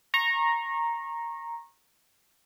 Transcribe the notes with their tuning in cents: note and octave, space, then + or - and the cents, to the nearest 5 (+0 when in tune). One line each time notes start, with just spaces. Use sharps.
A#5 +0 C#6 -30